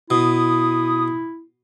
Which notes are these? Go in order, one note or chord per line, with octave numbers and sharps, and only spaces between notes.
B2 E4 D#6